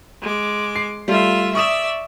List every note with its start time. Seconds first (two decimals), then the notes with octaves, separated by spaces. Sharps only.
0.22 G#3 D6
0.76 C7
1.08 G3 A3 F4 E5
1.55 D5 E5 C#6 D#6 E7